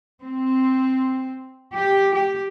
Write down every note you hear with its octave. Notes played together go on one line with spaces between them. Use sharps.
C4
G4
G4